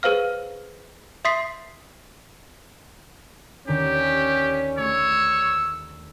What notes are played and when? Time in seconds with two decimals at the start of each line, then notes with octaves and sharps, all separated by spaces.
0.03 G#4 B4 C5 F5 F6
1.25 E5 C6 D#6 B6 C7
3.68 D#2 D3 C#4 G4 C#6
4.78 A3 C#5 E6